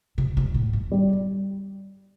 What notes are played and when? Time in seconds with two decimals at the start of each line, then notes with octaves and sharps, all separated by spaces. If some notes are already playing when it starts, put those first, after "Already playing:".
0.18 C3
0.37 C3
0.54 A2
0.73 G2
0.91 G3